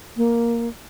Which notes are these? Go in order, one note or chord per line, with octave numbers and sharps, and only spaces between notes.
A#3